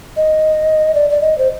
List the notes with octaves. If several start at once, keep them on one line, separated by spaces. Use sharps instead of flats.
D#5
D5
D5
D#5
C5